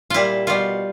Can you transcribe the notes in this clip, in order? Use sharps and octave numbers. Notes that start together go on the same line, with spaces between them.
A#2 G3 E4 F4
B2 G3 F4